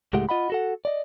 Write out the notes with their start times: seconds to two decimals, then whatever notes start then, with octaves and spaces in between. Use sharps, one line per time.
0.13 C#2 A2 G#3 A3 G4 F#5
0.29 F4 D#5 F#5 B5
0.50 F#4 A4 F#5
0.85 D5 D#5